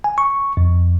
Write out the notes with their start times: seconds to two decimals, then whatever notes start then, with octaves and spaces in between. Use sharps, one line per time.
0.04 G#5
0.18 C#6
0.57 F2